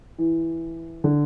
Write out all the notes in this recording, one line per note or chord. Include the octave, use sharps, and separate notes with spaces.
E3
D3